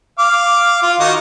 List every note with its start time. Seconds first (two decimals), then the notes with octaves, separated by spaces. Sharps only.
0.19 F5 D6
0.82 F4
1.00 D#3 F#4 D#5